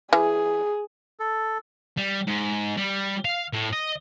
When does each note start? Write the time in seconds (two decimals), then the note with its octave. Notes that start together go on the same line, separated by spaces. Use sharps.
0.13 E3 G#4
1.20 A4
1.97 G3
2.27 G#2
2.77 G3
3.25 F5
3.53 A2
3.73 D#5